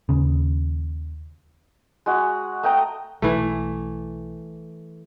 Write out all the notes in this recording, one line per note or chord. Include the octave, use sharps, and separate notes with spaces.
D#2 C#3
G#3 F#4
A3 D#5 G5 A#5
B1 E3 G3 A3